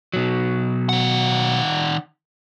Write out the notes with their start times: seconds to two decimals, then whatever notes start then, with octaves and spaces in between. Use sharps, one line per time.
0.14 B2 F#3
0.89 D#3 F#5